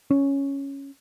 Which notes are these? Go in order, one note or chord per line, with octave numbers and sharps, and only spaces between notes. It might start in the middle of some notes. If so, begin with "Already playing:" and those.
C#4